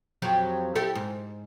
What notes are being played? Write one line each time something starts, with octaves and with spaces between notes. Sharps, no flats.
F2 F#3 G4
E4 G4 A4
G#2